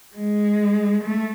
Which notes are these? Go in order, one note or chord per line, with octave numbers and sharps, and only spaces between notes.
G#3
A3